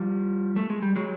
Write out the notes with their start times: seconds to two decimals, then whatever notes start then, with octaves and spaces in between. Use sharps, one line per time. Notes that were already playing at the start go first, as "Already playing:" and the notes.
Already playing: F3 G3
0.56 A3
0.70 G#3
0.82 G3
0.96 F#3 G#3